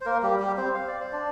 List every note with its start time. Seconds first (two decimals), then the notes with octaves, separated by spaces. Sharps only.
0.01 C5
0.05 A#3 A#4
0.22 G3 G4
0.39 G3 G4
0.57 C4 C5
0.74 F5
0.87 D5
1.00 C5
1.12 D4 D5